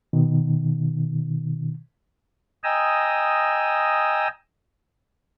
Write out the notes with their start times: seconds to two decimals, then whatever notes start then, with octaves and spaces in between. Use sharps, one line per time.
0.13 B2 D#3
2.64 D#5 G5 G#5 A#5 D#6 E6